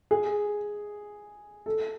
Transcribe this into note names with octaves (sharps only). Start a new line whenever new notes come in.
G#4
A4